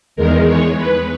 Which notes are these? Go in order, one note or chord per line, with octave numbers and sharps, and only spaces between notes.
E2 D#3 G#3 A#4
C#5
B4